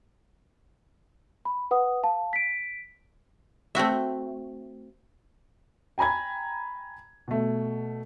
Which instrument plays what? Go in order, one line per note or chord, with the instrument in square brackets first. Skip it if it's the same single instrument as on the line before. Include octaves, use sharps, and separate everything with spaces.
[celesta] B5
B4 F#5 D#6
F5 A5
B6 D7
[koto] A3 C4 F#4 E5
[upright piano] G5 G#5 A#5 B5 G#6
B2 A3